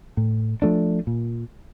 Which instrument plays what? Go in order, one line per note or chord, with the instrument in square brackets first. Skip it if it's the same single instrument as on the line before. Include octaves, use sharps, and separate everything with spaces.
[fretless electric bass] A2
F3 A3 D4
A#2